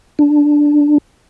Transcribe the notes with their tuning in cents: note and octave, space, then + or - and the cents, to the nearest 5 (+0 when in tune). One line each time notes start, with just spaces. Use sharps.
D4 +0